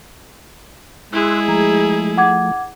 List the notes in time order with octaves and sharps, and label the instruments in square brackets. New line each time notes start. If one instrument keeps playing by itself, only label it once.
[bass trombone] G#3 [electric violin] E4 G#4 [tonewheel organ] C6 E6 F#6
[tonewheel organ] F3 A3 [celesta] A#5
[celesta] F#5 D6 G#6